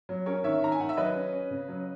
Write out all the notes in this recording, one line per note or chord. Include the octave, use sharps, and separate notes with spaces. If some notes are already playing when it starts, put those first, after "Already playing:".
F#3
C#4 A#4 C#5
D#3 C#5 E5
D#3 A#5
G#5
D#3 F#5
E5
F#3 B4 D#5
C#4
C#4
C#3
F#3